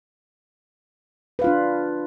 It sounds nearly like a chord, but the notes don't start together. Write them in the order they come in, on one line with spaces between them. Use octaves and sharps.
B4 F5 F4 D4